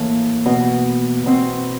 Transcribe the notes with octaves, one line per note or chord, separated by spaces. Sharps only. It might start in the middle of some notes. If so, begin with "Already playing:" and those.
Already playing: A2 E3 A#3
B2
B2 C4